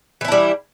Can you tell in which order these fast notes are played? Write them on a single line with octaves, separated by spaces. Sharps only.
E3 E4 D4 G3